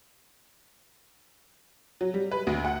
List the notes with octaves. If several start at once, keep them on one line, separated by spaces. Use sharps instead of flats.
F#3
G3
B4
D2
F#5